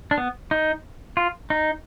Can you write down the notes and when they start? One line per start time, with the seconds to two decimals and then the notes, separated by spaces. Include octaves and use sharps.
0.11 D4
0.18 B3
0.51 D#4
1.17 F4
1.50 D#4